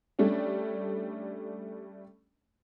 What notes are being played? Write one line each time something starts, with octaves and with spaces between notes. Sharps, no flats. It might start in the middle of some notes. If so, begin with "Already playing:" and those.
G3 A3 C#4 D4